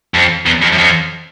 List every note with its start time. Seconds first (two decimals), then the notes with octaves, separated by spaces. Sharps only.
0.14 F2
0.46 E2
0.62 F2
0.72 F#2
0.78 F2